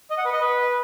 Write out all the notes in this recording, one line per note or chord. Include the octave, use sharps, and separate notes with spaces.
D#5
F#5
B4
D#5
B4